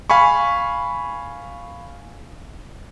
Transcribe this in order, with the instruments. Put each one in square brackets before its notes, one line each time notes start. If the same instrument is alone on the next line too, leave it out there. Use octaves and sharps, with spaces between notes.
[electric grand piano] F5 G#5 B5 C#6